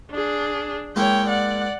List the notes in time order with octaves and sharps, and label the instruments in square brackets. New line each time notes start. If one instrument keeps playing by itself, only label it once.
[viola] D4 G#4
[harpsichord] G#3 A#3 E4 [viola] C#5 G5
[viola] D5 F#5